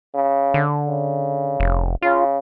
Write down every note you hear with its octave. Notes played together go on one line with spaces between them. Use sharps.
C#3
D3
C#3
F1
C#3 F4